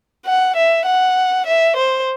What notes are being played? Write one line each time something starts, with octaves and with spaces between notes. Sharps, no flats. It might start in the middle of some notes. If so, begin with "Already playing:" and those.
F#5
E5
F#5
E5
C5